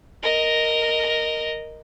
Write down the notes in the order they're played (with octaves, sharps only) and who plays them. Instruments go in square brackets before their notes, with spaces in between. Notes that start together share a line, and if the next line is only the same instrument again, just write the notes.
[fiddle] A#4 D#5